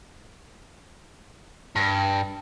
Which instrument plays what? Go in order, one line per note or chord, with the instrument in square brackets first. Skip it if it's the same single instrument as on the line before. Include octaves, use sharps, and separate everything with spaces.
[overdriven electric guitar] G2